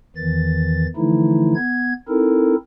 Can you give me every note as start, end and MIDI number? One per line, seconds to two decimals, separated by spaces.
0.16 0.87 40
0.16 0.87 51
0.16 0.87 52
0.16 0.87 93
0.96 1.54 50
0.96 1.54 52
0.96 1.54 53
0.96 1.54 57
0.96 1.54 63
0.96 1.54 64
1.55 1.93 59
1.55 1.93 92
2.08 2.55 60
2.08 2.55 63
2.08 2.55 64
2.08 2.55 69
2.08 2.55 70